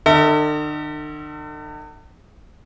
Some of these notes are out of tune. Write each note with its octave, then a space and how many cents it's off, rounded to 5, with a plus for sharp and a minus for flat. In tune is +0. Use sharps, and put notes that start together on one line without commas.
D3 +45 A4 +40 E5 -35